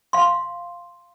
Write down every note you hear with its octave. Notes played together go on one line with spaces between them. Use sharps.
F5 C6